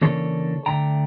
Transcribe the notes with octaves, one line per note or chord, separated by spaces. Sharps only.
C#3 E3 A#3 D4 A4 C#5
D2 D3 A3 D4 G5 A#5